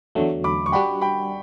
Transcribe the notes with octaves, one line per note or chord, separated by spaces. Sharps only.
E2 D3 F#3 A3
B5 D6
C#6
G3 D4 F#4 G5 B5
G5 B5